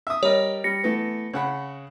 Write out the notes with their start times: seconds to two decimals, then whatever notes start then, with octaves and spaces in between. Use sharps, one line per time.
0.07 E5 D#6
0.23 G3 A#4 C#5 D#5
0.64 G3 A#6 C#7
0.84 E3 A3 B3
1.33 C#3 F#5 B5